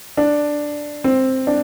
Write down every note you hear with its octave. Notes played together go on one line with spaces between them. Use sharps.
D4
C4
D4